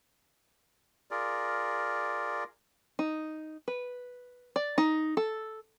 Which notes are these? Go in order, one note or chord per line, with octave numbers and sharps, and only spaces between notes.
F4 G#4 A#4 D5
D#4
B4
D5
D#4
A4